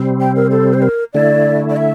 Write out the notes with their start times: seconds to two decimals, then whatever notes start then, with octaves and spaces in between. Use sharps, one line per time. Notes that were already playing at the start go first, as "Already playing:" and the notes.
Already playing: C3 G3 C4
0.21 G5
0.36 A#4
0.51 A4
0.74 C5
0.82 A#4
1.13 D3 A3 E4 D5
1.70 D5
1.77 E5